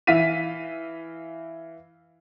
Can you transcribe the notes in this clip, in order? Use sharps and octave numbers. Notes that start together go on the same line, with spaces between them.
E3 E5 F5 B6 D#7